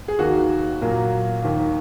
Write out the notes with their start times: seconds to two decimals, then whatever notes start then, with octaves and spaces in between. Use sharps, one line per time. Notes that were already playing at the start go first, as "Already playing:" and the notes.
0.08 G#4
0.19 D#2 D#3 A#3 F#4
0.81 A#2 F#3 A#3
1.42 D#2 D#3 A#3